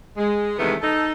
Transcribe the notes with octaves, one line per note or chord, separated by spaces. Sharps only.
G#3
C3 D#3 E3 G#3 A3 B3
D#4 A4